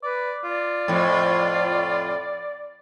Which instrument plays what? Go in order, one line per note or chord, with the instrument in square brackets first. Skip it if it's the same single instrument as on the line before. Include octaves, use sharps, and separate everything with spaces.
[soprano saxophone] B4 [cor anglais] D5
[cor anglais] F4 [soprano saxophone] D5
[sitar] F2 A2